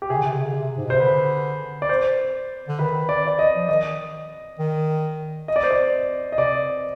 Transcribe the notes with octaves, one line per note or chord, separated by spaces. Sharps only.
G4
C3 G#4
D3
C3
D3
C3
D3
C3
G#2
B2
C3 C5
D3 B4
D5
C5
D3
D#3 B4
D5
D5
D#5
F3
D#3 D#5
D#3
D#5
D5
C5
D5
D#5
C3 D5